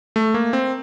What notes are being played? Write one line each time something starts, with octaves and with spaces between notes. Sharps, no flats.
A3
A#3
C4